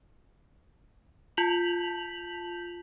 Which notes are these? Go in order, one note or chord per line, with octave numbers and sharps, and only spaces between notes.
F4 A5 G6 B6 F7 F#7